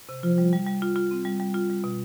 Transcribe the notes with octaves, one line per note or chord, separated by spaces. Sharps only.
C3
F3 F4
G3
G3
G3
F4
F4
C4
G3
G3
F4
G3
B2